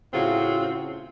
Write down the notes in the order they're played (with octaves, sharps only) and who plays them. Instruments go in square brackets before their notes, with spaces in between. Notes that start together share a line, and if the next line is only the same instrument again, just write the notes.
[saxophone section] A2 C#3 C4 F4 F#4